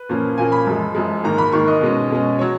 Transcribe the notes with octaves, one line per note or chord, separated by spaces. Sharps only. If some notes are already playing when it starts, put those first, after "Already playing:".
Already playing: B4
A#2 F3 A#3 C#4
A#2 F3 A#3 C#4 G#5
B5
F#2 F3 G#3
F#2 F3 G#3
G#2 D#3 A#3 A#5
B5
G#2 D#3 A#3 C#6
D#5
B2 G#3 C#4
B2 G#3 C#4
F#3 C#5